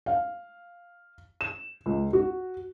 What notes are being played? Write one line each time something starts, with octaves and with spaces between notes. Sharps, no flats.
F5
E7
C#2
F#4